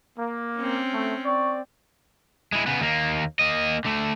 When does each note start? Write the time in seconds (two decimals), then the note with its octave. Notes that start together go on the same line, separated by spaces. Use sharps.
0.18 A#3
0.56 C4 C#4
0.93 A3
1.26 C4 D5 C#6
2.53 G#3 E4
2.66 C#3 B3
2.80 D#2 A#3
3.39 A#3 D#5
3.85 D3 A3